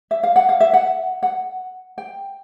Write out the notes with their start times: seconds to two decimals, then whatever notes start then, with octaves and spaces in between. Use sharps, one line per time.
0.11 E5
0.23 F5
0.36 F#5
0.49 F5
0.60 E5
0.73 F#5
1.23 F#5
1.98 G5